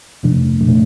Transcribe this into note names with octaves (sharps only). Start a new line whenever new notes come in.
F2 C3 F3 A3 D4
A#2 F3 A3